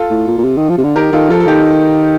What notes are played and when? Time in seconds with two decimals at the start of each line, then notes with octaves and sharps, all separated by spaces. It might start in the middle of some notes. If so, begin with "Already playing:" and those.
Already playing: F4 A4
0.11 A2
0.28 A#2
0.38 A#2
0.44 C3
0.58 D#3
0.70 F3
0.78 C3
0.84 D3
0.96 D#3 G4 A#4
1.13 D#3 F4 A4
1.30 F3 F4 A4
1.40 A4
1.47 D#3 D#4 G4